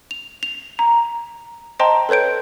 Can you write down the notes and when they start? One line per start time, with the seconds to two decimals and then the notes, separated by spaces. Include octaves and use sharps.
0.11 F7
0.43 F7
0.79 A#5
1.80 C5 D#5 G5 A5 A#5 C6
2.09 A4 B4 C#5 G6 D7